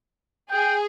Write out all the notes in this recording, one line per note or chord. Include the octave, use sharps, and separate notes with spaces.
G#4 G5